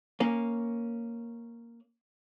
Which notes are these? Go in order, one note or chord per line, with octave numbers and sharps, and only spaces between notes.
A#3 C#4